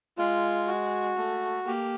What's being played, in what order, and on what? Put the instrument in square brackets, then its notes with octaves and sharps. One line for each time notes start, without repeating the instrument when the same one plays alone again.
[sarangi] G#3 [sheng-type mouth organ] F4
[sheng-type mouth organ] F#4
[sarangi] A3
[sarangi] A#3 [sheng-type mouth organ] G4